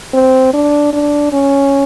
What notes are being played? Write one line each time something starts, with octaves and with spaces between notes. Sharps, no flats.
C4
D4
D4
C#4